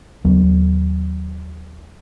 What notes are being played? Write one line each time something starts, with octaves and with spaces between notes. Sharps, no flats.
D#2 F#3 B3